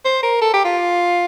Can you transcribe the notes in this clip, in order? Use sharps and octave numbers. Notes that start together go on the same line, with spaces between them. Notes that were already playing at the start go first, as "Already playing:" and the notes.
C5
A#4
A4
G4
F4